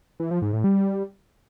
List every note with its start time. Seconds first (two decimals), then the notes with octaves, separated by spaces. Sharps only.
0.20 E3
0.31 F3
0.42 G#2
0.53 A2
0.64 G3